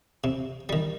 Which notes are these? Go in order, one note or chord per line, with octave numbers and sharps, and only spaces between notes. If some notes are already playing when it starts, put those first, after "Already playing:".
C3
D#3 G3